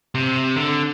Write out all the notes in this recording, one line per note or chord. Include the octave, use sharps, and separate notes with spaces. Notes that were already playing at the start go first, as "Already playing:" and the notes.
C3
D3